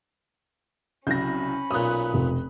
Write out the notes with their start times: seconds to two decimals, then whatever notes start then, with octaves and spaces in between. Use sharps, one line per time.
1.07 C2 C#3 F#3 C#4 B5 G6 A#6
1.71 B1 A#2 D#6 F#6
2.14 F1